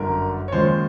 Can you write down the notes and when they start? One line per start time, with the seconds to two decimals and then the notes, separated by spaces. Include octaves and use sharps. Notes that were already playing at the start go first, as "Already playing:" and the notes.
Already playing: G1 F#2 D3 A#4
0.48 C#5
0.52 D#2 C#3 F3 G#3 C5